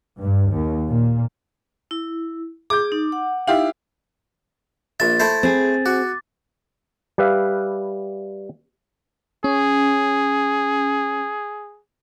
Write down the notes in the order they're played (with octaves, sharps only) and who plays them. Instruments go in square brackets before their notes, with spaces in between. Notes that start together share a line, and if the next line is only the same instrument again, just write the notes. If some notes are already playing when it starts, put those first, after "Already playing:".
[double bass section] G2
D#2
A#2
[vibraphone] E4
[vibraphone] G#4 [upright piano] D6 G6
[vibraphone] D#4
F#5
[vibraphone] D#4 [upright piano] E4 G4 F5
[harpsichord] A#1 E5 [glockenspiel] A6
[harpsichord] A3 E4 C5
[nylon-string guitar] C4 G#4
[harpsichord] F#4 [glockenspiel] D6
[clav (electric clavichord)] G3 G4 B4 E5 F5
[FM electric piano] C#4 [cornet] G#4